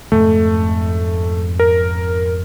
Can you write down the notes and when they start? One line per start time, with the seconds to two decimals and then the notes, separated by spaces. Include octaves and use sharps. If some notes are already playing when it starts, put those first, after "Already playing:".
0.12 F2 G#2 C#3 A3
1.60 A#4